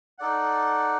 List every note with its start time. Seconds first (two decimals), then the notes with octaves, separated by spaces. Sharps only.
0.19 D#4 A4 D5 F#5